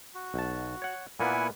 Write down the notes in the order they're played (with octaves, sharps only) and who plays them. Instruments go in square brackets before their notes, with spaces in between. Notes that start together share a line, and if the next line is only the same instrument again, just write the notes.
[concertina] F#4
[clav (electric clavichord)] B1 A5
C#5 F#5
[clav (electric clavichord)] A#2 A#3 B3 [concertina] E4 F#5 G#5